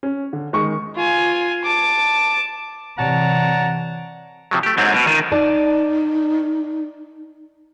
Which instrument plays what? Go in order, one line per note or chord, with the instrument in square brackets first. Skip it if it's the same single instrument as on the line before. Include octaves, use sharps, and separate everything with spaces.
[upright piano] C#4
D3
D#3 G#3 C#6
[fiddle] F4 G#5
A5 D6
[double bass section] C3 E3 [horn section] C#5 A5 A#5 [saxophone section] D5 F#5
[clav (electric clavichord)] C3 F3 F#3
A3 G4
[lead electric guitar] G#2 F#3 [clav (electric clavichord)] C4
[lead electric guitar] B2
[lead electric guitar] D#3 [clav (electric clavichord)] F4
[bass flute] D#4 [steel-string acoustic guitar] D5 A5